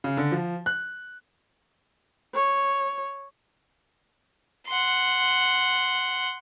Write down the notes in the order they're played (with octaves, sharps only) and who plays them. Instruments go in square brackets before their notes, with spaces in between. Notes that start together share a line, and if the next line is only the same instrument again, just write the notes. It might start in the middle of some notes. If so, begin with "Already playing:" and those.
[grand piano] C#3
D3
F3
F#6
[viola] C#5
[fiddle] F#5 C6